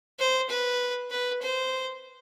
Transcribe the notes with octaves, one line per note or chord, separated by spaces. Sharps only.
C5
B4
B4
C5